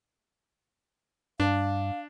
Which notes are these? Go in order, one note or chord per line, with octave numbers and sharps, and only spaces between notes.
G2 D4 F5